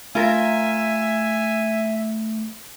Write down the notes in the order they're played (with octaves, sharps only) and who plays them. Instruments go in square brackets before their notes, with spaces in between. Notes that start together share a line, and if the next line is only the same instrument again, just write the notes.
[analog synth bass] A3 [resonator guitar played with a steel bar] F4 A#4 [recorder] E5 [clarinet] G#5